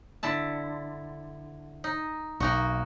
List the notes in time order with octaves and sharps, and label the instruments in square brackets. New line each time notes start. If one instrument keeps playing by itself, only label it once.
[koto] D3 E4 A5
D#4
[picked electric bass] B1 [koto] A#3 D#4 F#4